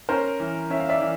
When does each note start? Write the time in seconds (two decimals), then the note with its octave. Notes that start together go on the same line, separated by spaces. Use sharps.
0.09 C#4 A#4 C5
0.40 E3
0.70 C#4 E5
0.80 F5
0.89 D5 E5
1.01 E3